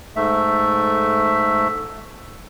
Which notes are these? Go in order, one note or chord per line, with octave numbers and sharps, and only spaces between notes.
G#2 A3 E5